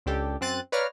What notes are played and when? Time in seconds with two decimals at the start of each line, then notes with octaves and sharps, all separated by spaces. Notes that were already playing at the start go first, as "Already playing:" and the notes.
0.06 C#2 D4 G4 A4
0.41 F#2 C4 F#6 A6 D#7
0.72 B4 C#5 D5 F5 A#5 F6